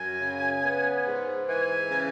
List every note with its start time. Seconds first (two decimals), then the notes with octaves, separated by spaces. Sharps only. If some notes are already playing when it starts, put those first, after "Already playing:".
Already playing: F#2 G#5
0.21 C#3
0.64 B3
1.07 G#2
1.49 E3 G#5
1.90 C#3